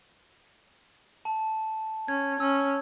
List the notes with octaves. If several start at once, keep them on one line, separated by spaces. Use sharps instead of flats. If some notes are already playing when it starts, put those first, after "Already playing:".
A5
C#4 G#6
C#4 E6